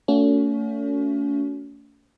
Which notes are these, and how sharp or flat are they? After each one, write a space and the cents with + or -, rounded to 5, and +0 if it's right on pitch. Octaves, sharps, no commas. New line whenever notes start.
A3 +30 C#4 +40 F#4 +0